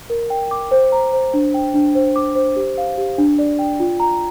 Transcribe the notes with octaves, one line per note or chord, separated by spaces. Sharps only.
A#4
G5
D6
C5
A#5
C5
D4
G5
D4
C5
D6
C5
G4
F5
G4
D4
D5
G5
F4
A#5